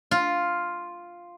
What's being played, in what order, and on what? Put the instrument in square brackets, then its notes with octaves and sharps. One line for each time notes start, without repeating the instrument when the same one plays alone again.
[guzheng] F4